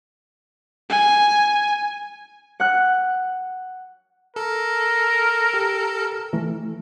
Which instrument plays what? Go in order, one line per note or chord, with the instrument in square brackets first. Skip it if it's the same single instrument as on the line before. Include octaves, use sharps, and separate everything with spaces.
[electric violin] G#5
[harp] F#5 F#6
[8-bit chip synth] A4 [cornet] A#4
[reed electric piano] G4
E3 A3